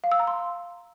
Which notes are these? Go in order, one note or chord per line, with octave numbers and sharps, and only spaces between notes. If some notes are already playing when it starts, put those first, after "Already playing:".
F5
E6
A#5
C6